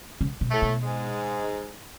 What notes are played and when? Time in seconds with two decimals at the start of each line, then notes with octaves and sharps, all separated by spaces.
0.21 C#3
0.41 B2
0.51 A2 A3
0.62 B2
0.83 G#2 G#3